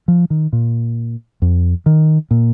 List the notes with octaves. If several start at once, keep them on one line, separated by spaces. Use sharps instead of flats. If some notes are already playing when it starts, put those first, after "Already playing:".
F3
D#3
A#2
F2
D#3
A#2